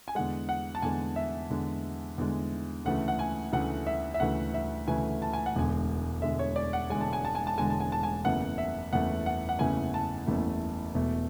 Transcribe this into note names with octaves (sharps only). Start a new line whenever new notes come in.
G#5
E2 D3 G#3 F#5
F#5
A5
E2 D3 G#3 G#5
E5
E2 D3 G#3
E2 D3 G#3
D2 C#3 E3 A3 F#5
F#5
G#5
D2 C#3 E3 A3 F#5
E5
E5
D2 C#3 E3 A3 F#5
E5
D2 C#3 E3 A3 G#5
A5
G#5
F#5
E1 E2 D3 G#3 G#5
E1 E2 D3 G#3 E5
C#5
D5
F#5
E1 E2 D3 G#3 G#5
A5
G#5
A5
G#5
A5
E1 E2 D3 G#3 G#5
A5
G#5
A5
G#5
F#1 E2 C#3 E3 A3 F#5
E5
F#1 E2 C#3 E3 A3 F#5
F#5
F#5
F#1 E2 C#3 E3 A3 G#5
A5
F#1 E2 C#3 E3 A3
E1 E2 B2 A3